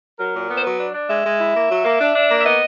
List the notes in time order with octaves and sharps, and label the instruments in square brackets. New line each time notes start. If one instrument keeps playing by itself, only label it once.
[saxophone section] F#3 A#4
A#2
B3
C5
F#3 B4
D4
D4
G#3 E5
G#3
E4
A#3
F#3
A#3
D4
D4
A#3
E5
B3 D#5